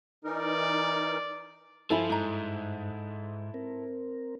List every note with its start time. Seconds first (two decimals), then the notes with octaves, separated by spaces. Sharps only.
0.25 E3 D#4 A#4 D5
1.90 G2 F3 E4 A4 C5 G#5 B5
2.10 G#2 D#4 A#5
3.54 C4 A#4